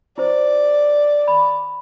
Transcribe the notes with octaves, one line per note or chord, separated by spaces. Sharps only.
E4 C5 D5
B5